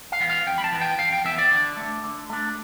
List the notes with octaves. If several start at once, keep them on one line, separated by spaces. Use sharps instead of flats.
F5
E3 B3
F5
F2 G5
B5
A5
E3 B3
G5
F2 F5
G5
E3 B3 E5
D5
D3
A3
D4
D3
A3 D4